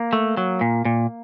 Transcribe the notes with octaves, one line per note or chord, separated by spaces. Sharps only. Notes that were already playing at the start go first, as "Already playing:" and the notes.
Already playing: A#3
A3
F#3
A#2
A#2